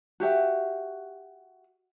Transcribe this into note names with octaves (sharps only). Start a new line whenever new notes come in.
F#4 G4 E5 F#5